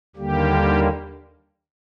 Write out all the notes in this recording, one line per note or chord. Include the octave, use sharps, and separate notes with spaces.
D#2 D3 G3 A#3 G4